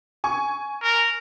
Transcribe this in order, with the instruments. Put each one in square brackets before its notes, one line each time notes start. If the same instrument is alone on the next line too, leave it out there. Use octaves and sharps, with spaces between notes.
[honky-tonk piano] G#5 C#6
[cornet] A#4